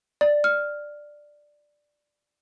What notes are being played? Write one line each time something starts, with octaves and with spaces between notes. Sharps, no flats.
D5
F6